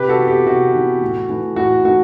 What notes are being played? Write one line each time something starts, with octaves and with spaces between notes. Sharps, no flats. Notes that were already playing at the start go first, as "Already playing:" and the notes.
Already playing: C3 G4 B4
F#4 A4
E3 B3
G4
C3 F#4
E3 B3
A2
E3 A3
A2 F#4
E3 A3 F#4